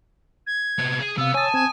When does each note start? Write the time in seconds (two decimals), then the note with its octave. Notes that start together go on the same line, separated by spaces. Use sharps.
0.47 G#6
0.78 C3 B3
0.99 G#4
1.18 C3 B3 F5 E6
1.34 C#5 G#5 A5 D#6 A6
1.54 C4 G#6